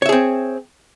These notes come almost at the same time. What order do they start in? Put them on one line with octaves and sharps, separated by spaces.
C#5 E5 G#4 C4